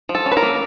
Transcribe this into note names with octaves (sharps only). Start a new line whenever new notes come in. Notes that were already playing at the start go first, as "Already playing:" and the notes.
F3
A4
C#4
B4
A#4
A#3